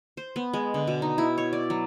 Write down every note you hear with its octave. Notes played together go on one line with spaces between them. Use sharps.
C5
B3
G#3
D3
B2
D#4
E4
C#5
D5
F#3